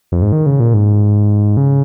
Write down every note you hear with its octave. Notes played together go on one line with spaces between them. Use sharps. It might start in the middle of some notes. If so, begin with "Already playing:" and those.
F2
G#2
D#3
C#3
A#2
G#2
C#3